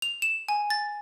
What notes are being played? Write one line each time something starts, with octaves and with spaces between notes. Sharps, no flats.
F7
E7
G#5
A6